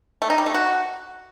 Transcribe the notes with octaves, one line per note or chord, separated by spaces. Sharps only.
A3
D#4
G3
A3
F#4